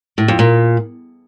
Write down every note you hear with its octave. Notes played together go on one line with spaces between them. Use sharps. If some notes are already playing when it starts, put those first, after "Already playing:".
A2
F2
A#2